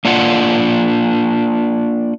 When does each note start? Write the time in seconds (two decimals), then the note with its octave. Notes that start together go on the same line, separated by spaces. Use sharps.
0.05 A#3 D4 F4 F#5